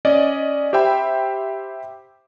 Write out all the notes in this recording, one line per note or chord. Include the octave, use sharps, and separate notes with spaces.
C#4 D5 D#5
G4 C5 E5 G5 B5